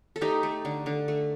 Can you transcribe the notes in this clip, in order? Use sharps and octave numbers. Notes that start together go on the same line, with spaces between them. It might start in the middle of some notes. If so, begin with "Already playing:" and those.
A4
A3 D#4 G4
A3
D3
D3
A3